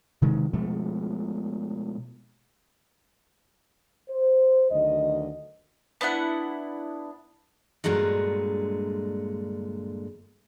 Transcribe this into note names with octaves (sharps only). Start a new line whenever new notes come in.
C3 D#3 G#3
B2 F3 G#3 A3
C5
D2 D#3 F#3 D#5
B3 D4 E4 F#5
G2 A#2 D3 F#3 G#3